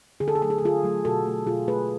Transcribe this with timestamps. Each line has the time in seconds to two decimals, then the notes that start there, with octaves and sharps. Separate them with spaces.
0.20 D3 G#4
0.28 A4
0.35 G#4
0.41 F#3 A3 A4
0.50 G#4
0.58 A4
0.62 D3 F4 G#4
0.83 F#3 A3
1.05 B2 F#4 A4
1.26 A3
1.47 B2 F4 G#4
1.68 A3 G#4 B4